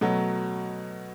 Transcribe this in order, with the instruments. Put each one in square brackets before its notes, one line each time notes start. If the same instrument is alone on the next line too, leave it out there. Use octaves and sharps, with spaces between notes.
[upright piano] B2 F#3 A3